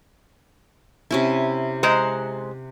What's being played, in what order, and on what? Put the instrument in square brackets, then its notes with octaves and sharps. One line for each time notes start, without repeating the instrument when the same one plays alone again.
[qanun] C3 C#4 E4
[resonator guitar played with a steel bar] G#3 C5 A#5 [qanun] F#5